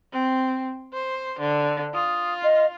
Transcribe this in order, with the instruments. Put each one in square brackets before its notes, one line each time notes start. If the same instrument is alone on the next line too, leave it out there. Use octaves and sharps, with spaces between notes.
[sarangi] C4
C5
D3
[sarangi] F4 [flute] D#6
[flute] D#5